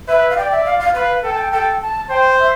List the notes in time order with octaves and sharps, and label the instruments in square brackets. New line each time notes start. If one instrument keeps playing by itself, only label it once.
[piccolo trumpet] B4 [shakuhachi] E5
[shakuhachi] F5
[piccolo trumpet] D5 [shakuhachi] G5
[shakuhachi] E5
F5
F5
[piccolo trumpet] B4 [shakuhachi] F5
[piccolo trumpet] A4 [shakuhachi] G5
[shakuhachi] A5
G5
[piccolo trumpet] A4 [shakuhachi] G5
[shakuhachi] A5
[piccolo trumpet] C5 [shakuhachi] G5
[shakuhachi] E5